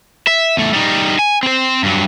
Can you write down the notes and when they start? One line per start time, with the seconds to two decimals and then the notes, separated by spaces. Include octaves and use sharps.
0.27 E5
0.57 E2 A3
0.73 G3 D#4
1.19 G#5
1.43 C4 C5
1.83 G2 F#3